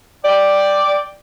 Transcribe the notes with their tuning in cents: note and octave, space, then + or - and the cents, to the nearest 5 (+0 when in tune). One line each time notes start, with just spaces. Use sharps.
D5 +5 G5 +0